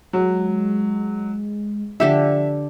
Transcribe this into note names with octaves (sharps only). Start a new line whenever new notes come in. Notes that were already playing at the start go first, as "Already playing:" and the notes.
F#3 G#3
D3 F3 G4 A4 E5